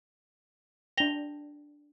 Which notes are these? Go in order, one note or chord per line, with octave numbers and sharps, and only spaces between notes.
D4 G5 A#6 F7 G7